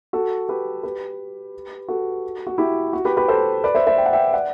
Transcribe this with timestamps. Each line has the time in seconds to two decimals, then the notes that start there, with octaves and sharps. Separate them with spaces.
0.13 F#4 A4
0.49 G4 B4
0.83 G4 B4
1.88 F#4 A4
2.47 F#4
2.58 E4 G4
2.93 F#4
3.05 G4 B4
3.17 G4 B4
3.28 A4 C5
3.64 B4 D5
3.75 C5 E5
3.87 C5 E5
3.98 G5
4.06 F#5
4.13 E5 G5
4.33 D5 F#5